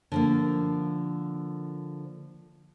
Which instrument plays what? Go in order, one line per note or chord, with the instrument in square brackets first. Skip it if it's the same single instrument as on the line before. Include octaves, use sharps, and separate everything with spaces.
[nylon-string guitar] D3 F3 A#3